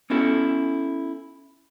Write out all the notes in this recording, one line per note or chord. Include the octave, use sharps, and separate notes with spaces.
B3 C#4 E4 F#4 A4